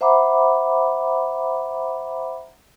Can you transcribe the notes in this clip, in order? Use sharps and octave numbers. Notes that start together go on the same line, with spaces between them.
C5 E5 F#5 A#5 B5 D6